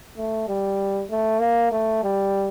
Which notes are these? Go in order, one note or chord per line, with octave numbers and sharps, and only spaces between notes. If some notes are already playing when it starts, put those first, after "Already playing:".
A3
G3
A3
A#3
A3
G3